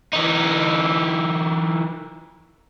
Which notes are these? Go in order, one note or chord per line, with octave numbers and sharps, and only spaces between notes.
E3 D#4